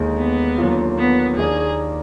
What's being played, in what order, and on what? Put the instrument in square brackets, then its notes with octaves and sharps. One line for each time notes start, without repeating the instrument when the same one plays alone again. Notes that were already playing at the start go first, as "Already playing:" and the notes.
Already playing: [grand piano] D#2 D3 G#3 D#4
[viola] B3
[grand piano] D#2 D3 F#3 A#3 F4
[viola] B3
[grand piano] D#2 D#3 A#3 D4 [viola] G#4